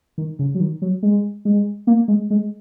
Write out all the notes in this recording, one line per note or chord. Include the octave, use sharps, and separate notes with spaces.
D#3
C#3
F#3
D#3
F#3
G#3
G#3
A#3
G#3
G#3